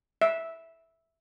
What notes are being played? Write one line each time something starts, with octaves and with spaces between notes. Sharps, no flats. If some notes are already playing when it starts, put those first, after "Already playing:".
E5